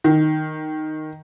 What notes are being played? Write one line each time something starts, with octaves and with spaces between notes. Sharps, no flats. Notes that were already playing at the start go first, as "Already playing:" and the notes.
D#3